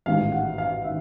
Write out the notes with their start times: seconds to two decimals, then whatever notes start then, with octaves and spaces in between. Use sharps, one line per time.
0.06 A1 G#2 D#3 F5
0.32 F#5
0.58 F5
0.84 D#3 E5